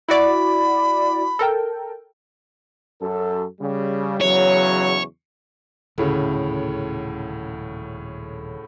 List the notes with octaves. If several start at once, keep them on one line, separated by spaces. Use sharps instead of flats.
E4 F#4 D5 B5
A4 A#4 G5
F#2 A4
C#3 G3
E2 C#3 F#3 C#5
D#1 D2 A2 C#3